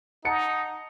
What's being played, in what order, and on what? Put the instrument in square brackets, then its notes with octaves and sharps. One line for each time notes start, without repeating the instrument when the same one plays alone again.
[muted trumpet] D#4 [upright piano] F#5 A5 C#7